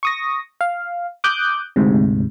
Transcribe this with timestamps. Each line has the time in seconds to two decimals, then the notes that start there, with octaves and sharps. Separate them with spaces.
0.03 C#6 D#6 A#6
0.61 F5
1.24 D6 D#6 F#6 G6
1.76 D2 G#2 C3